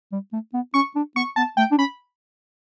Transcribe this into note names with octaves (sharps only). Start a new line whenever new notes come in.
G3
A3
B3
C#4 C#6
D4
B3 C#6
B3 A5
A3 G5
D4
C#4 B5